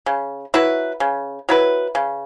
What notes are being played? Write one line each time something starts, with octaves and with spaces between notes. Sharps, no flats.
C#3
F#3 E4 B4
C#3
F#3 E4 B4
C#3